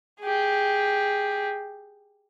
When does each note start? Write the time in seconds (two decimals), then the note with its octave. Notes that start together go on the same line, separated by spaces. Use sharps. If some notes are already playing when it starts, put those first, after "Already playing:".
0.21 G4 G#4